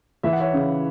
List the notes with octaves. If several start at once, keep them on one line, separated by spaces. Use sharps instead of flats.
E3 E5
F#5
C#5 E5
C#3